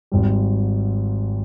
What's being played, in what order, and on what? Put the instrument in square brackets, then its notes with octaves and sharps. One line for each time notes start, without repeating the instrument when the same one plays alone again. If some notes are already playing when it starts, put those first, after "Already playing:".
[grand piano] G#1 G#2 G3